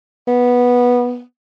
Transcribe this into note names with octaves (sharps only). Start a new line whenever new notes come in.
B3